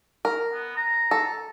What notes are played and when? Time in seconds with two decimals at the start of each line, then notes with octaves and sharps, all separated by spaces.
0.25 A#4
0.53 B3
0.77 A#5
1.11 A4